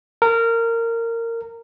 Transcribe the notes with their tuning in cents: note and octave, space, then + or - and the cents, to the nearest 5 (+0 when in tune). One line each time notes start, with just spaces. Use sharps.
A#4 -20